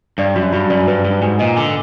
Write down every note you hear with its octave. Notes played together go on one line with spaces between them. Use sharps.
G2 D5
F#2 F#4
G2 F#4
F#2 D5
G2 B4
G2 F#4
G#2 G#5
A#2 D#5
D3 G#5